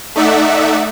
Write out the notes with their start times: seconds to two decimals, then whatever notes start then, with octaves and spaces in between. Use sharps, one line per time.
0.16 A3 D#4 D5 E5 F#5